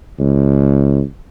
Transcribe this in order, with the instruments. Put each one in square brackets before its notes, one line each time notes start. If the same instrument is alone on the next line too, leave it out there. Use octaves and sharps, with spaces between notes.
[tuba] C#2